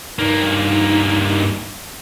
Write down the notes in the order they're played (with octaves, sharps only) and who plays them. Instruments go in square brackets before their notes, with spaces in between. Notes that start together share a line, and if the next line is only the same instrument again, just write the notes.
[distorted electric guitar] G2 A#3 [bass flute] D#4